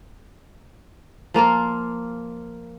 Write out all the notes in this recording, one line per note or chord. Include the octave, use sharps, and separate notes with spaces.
F3 A#3 F4 A#4